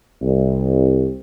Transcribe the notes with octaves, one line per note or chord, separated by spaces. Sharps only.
C2